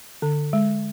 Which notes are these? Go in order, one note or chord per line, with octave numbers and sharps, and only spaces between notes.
D3
G#3